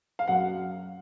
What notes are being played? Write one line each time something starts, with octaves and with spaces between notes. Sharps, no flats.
F5
F#2 F#5